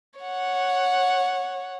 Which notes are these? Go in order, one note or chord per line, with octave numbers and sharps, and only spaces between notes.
C#5 F#5